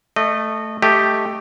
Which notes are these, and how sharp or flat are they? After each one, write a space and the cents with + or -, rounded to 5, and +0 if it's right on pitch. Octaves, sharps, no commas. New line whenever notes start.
A3 +0 D#5 -25
A3 +0 G4 +0 D#5 +0